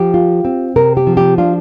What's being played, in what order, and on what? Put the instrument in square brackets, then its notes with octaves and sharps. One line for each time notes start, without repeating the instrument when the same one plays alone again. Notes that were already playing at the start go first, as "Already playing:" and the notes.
Already playing: [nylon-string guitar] F3 G4
F4
C4
C3 A#4
G4
F3
G4
D4 F4